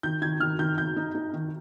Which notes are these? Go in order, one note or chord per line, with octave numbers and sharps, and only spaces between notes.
D#3 G6
D#3 G#6
D#3 F6
D#3 G6
D#3 G6
D#4
D#4
D#3